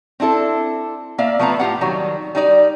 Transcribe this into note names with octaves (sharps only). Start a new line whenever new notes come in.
C4 D4 E4 A4
A#3 D5 E5 F5
F3 A3 B3 C4 A#5
A2 F4 G4 F#5
D#3 F#3 G3
G3 D#4 D5